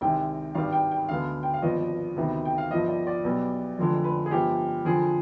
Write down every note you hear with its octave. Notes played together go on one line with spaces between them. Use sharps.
C2 C3 D#3 G#3 G5
G#1 G2 D#3 G3 F5
G5
G5
D2 D3 G#3 B3 F5
G5
F5
G#1 G2 F3 B3 D#5
D2 C3 D#3 B3
G5
F5
G1 G2 F3 D#5
D5
D5
B1 B2 G3 B3
F1 F2 D3 F3 G#3
B4
G#4
G1 G2 F3 G#3 G4
F2 D3 F3 G#4